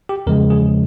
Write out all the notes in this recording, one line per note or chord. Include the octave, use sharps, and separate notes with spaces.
G4
E2 C#3 F3 G#3 A#4
G#4